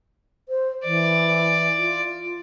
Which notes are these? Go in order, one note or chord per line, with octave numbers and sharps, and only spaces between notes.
C5
E3 D5
F4